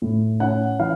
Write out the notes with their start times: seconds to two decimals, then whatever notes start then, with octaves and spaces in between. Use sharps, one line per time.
0.02 A2
0.40 C#4 F#5
0.80 E3 F5